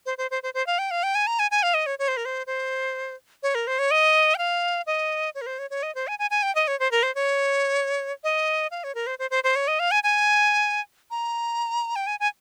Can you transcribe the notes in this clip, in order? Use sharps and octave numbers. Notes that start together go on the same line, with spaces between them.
C5
C5
C5
C5
C5
F5
G5
F5
G5
G#5
A#5
G#5
G#5
F5
D#5
C#5
C#5
C5
A#4
C5
C5
C#5
A#4
C5
C#5
D#5
G5
F5
D#5
C#5
A#4
C5
C#5
C#5
D#5
C5
G#5
G#5
G#5
G5
D#5
C#5
C5
A#4
C5
C#5
D#5
F5
C#5
A#4
C5
C5
C5
C5
C#5
D#5
F5
G#5
G#5
A#5
G5
G#5
G#5